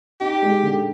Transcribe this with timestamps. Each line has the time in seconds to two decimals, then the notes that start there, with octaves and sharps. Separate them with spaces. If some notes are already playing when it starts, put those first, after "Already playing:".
0.21 D#4 G4
0.42 G#3
0.63 D3